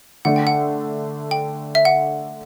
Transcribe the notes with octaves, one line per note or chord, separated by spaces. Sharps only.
D3 A3 D4 F#5
G5
F#5
G5
E5
F#5